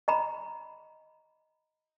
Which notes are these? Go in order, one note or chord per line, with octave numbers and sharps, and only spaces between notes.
D#5 A#5 B5